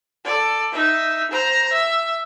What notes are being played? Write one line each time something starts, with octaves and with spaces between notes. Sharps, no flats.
A4 D5
D#4 E5
C5 A#5
E5